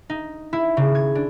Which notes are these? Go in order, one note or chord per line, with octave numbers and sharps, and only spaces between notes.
D#4
E4
C#3
G#6
D4